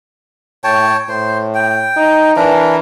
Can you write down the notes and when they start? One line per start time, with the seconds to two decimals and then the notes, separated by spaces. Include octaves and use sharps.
0.64 A2 C#5 G5 A5
1.09 A2 C5
1.55 G5
1.97 D#4
2.36 E3 D4 A#4